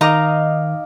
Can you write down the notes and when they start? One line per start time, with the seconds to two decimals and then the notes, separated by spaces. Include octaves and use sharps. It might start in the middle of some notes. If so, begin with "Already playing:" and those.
0.01 D#3 D#4 D#5 F5 A#5 D6